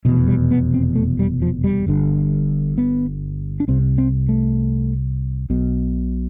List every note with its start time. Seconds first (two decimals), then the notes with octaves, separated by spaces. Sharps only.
0.05 B2 E3
0.08 F1 E2
0.28 G3
0.51 B3
0.74 C4
0.96 A3
1.19 G3
1.42 F3
1.64 G3
1.87 G1 G2 D3
2.78 B3
3.60 D4
3.68 C2 C3 C4
3.98 C4
4.29 A3
5.50 B1 B2